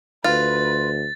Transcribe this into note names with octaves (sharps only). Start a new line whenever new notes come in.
D2 F4 B4 A6